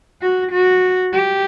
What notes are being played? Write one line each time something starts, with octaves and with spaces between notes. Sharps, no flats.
F#4
F#4
G4